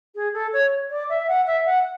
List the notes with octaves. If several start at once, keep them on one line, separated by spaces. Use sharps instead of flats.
G#4
A4
C#5
D5
E5
F#5
E5
F#5